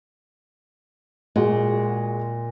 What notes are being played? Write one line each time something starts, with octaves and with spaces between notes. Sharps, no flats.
A#2 G#3 F#4